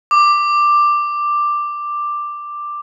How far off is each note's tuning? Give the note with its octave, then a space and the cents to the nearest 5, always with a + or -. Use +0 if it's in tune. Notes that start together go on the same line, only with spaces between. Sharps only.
D6 +10